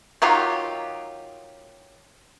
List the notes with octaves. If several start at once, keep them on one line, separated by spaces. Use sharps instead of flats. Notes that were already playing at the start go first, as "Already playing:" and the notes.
D#3 F#3 F4 G4